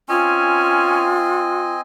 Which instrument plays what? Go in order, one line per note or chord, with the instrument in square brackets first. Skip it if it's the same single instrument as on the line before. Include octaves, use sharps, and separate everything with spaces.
[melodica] C4 D#5 G#5 [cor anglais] C#4 [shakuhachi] F4